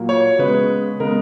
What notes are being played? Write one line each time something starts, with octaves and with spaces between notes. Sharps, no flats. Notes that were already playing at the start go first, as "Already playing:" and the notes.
Already playing: A#2 F#3 A#3
C#5
C#3 G#3 B3 B4
C#3 G#3 B3 A#4